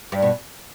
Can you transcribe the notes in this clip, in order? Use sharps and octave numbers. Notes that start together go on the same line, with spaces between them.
G2
B2